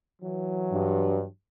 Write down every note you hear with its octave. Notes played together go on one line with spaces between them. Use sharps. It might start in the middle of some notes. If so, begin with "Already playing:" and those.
E3 F#3
G2